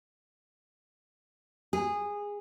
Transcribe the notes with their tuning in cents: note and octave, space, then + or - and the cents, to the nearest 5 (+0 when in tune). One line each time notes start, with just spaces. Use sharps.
G#4 -15